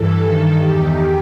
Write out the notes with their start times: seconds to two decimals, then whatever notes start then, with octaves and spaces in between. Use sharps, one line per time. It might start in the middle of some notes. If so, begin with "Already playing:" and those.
Already playing: G2 E3 A4
0.24 G2 D#3 A4
0.59 E2 D#3 G4